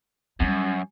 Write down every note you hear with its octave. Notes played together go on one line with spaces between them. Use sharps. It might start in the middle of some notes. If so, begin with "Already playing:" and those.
F#2 G3 C#4